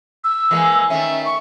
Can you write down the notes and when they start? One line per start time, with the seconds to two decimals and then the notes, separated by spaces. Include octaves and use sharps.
0.24 E6
0.51 E3 G#3 A#3
0.90 D#3 A3 C#4 E5
1.26 C#6